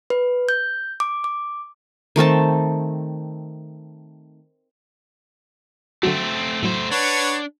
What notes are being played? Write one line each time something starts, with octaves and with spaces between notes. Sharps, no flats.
B4
G6
D6
D6
D#3 A3 C4 A5
D3 F#3 A3 C4 F#4
A2 F#3 A3 C5
D4 B4 C#5 F#5